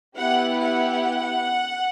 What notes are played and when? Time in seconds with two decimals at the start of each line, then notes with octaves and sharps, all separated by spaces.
0.16 B3 E4 G4 F#5
0.59 F#5